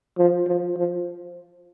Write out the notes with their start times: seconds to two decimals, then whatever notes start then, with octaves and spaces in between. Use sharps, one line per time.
0.18 F3
0.47 F3
0.76 F3